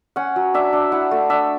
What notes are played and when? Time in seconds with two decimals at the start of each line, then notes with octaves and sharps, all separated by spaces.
0.16 C#4 F#5
0.36 F#3
0.54 D4 E5
0.73 D4
0.92 E4 F#5
1.11 A3
1.30 D4 E5